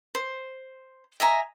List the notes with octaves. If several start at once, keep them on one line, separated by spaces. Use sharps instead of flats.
C5
D#5 E5 G#5 A#5